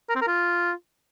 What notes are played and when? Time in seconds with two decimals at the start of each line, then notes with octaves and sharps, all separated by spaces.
0.09 A#4
0.15 C4
0.21 A#4
0.27 F4